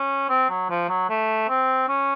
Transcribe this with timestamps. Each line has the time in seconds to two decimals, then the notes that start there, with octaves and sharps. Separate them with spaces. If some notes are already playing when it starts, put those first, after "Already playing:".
Already playing: C#4
0.29 C4
0.50 F#3
0.70 F3
0.89 F#3
1.09 A3
1.49 C4
1.89 C#4